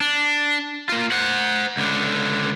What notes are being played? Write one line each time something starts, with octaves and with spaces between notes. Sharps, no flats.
D4
A#3 F4
C5 F#5
C#2 D3